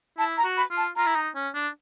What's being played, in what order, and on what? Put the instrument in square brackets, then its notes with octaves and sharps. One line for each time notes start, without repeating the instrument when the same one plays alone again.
[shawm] E4 [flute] A5
[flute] A#5
[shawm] F#4
[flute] B5
[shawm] F4
[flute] A5
[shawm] F4 [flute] A#5
[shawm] E4
D#4
C#4
D4